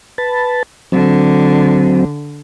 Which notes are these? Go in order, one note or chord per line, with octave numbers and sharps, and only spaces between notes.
B4 A5
D3 F#3 C4